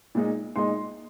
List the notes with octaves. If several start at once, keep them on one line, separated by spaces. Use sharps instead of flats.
A#2 G#3 D#4
A#2 G#3 D#4 C6